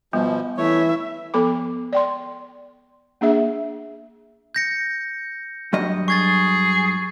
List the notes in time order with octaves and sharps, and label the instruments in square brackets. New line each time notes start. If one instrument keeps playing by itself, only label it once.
[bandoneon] B2 F3 [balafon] G3 B3
[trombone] E3 [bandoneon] A3 C#5 [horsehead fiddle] E4 E5
[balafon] F3 B3 A4 B5 D6
D5 G5 C6
A#3 D4 G#4 E5
[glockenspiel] G6 A#6 C#7
[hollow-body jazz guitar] G2 F#3 D#5
[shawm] G#4 [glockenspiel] C#6 G#6 A6